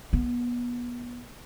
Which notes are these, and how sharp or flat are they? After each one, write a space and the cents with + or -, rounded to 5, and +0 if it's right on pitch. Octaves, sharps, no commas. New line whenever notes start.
B3 -30